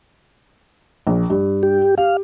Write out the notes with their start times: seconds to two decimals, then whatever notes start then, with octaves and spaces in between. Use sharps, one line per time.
1.07 A#1
1.30 G2
1.63 G4
1.97 G4 F5